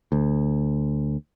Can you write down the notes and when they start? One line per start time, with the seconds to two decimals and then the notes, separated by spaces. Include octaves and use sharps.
0.12 D2